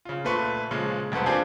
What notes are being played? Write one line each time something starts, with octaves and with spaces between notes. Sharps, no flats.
C#3 F4
A#2 A3 B4 C6 C#6
A#2 C#3 F3 G#3
E1 D2 A4 B4 C5
A#3 C4 D4 F4 G4 G#4